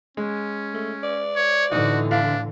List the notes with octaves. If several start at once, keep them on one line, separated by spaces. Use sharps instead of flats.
G#3 C#4
A3
D5
C#5
A2 D3 E3 D#4 F#4
D4 E4 F5